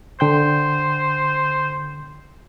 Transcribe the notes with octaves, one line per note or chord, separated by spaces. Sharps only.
D3 C5 G5 G6